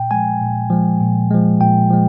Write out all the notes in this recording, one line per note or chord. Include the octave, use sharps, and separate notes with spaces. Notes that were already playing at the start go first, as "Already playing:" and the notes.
Already playing: A#2 G5
F3 G#3 G#5
A#2
F3 G#3
A#2
F3 G#3
A#2 G5
F3 G#3